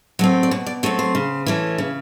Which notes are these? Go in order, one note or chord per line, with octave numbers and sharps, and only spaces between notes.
F#3 A3 C4
D5
B2 C#5
D5
F#3 A3 C4 C#5
C5
C#3
E3 A3 C#4
C#3